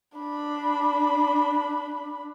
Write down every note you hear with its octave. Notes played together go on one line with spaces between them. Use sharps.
D4 B5